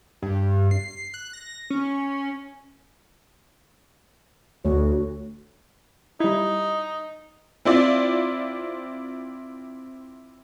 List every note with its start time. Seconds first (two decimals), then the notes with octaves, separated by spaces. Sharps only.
0.22 G2
0.71 C7
1.14 F#6
1.33 A#6
1.70 C#4
4.65 D2 A3 F#4 C#5
6.20 G3 D#4 E4
7.65 C4 E4 F4 D5